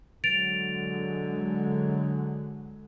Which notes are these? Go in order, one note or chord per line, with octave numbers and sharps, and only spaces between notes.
D3 F#3 G#3 A6 D7 F7